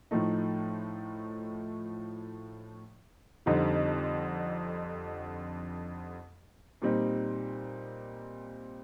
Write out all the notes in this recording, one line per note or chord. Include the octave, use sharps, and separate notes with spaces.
A2 F3 A3 D#4
F2 D3 G3 C4 D#4
A#2 G3 C4 D#4